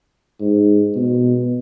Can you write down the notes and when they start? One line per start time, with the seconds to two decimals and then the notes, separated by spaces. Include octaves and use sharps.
0.41 G#2
0.96 B2